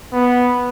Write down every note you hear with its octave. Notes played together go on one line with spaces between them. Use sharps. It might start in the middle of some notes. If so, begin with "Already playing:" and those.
B3